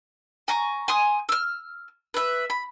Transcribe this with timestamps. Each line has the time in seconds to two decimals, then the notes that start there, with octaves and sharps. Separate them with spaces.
0.48 G#5 A#5 C#6
0.88 G#5 C6 D#6
1.29 E6 F6
2.14 B4 E5
2.50 B5